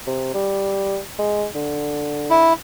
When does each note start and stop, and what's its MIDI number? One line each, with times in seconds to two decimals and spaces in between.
0.07 0.32 48
0.34 0.99 55
1.19 1.46 56
1.55 2.60 50
2.30 2.53 64